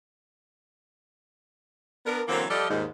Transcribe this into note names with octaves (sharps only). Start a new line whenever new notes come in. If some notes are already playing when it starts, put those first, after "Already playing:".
B3 D4 A#4
D3 E3 F#3 A#3 C4
F3 G3 G4 A4 D5 D#5
D#2 G#2